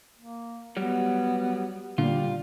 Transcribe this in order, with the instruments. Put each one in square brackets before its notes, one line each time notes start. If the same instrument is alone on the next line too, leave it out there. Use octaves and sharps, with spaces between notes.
[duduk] A#3
[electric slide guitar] F#3 G3 [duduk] B3
[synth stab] A#2 D3 [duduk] G3 [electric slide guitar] F4